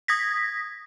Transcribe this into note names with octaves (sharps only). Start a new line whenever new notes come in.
D#6 G#6 A#6 B6